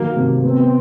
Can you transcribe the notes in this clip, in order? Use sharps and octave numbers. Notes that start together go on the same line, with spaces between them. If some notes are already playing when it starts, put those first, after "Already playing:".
Already playing: D#3 F#3 A#3
C3
B3 C4